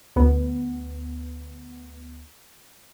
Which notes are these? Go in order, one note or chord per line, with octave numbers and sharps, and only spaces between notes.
D2 B3